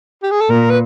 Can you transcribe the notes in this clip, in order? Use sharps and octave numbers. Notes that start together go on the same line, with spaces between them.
G4
G#4
A4
A#2 A#4
B4